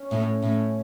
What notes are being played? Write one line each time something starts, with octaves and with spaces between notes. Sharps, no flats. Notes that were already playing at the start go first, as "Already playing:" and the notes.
Already playing: C#4
A2
A2